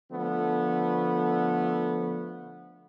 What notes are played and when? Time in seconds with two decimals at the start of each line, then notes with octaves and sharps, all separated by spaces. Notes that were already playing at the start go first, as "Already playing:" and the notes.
0.11 D3 F3 A3 B3